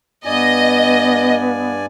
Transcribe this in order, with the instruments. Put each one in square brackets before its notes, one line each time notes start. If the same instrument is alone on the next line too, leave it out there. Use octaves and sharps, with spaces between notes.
[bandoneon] G2 D5 G#5 [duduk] B3 [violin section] D#5